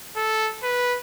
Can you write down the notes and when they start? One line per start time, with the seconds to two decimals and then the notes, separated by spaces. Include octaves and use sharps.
0.16 A4
0.63 B4